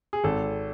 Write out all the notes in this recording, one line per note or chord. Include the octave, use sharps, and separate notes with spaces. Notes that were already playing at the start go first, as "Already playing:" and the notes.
G#4
G#1 A4